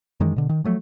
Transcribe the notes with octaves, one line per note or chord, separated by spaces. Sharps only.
F#2 D#3 E3 G#3
B2 D3
D#3
F3 F#3 A3